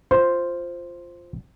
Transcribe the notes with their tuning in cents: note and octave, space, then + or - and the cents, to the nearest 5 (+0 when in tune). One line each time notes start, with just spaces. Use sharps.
F4 +0 C5 +0